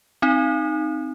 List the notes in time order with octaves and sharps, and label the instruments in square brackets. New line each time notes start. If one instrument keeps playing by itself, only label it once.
[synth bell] C4 D#4